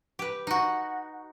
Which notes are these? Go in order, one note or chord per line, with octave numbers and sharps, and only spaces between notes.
G4 B4
D#4 F#4